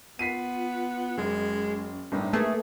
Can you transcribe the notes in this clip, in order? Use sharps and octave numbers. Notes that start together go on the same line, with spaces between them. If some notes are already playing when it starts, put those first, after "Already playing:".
B3 F4 B6 C7 D#7
F#1 G#3 C#4
G1 A2 D4 D#4
A3 A#3 G#4 B4